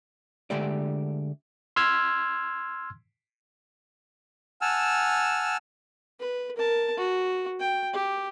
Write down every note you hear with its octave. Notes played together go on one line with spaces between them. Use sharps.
D3 G#3 A3 G4 D5
C6 E6 F6 G#6
F#5 G#5 A5 E6 F6
B4
A#4 A5
F#4
G5
G4